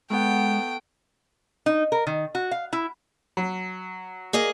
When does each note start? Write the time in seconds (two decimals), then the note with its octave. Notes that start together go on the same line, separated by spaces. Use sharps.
0.10 G#3 A3 B3 F#5 G5
1.66 D#4
1.92 A#4
2.07 D#3
2.35 F#4
2.51 F5
2.73 E4
3.37 F#3
4.33 A#3 G#4 D#5